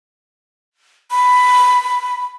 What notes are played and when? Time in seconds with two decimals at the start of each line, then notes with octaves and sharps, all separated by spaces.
1.11 B5